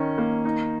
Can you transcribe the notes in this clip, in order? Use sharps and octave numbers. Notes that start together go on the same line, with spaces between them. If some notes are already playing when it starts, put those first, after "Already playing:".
Already playing: D#3 C#4
A#3
D#4